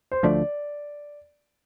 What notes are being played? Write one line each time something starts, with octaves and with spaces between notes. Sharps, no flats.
C5
D2 D3 F3 A3 D5